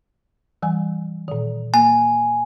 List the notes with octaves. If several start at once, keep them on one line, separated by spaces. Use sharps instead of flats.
E3 G3 G#5
A#2 D#3
A#3 G#5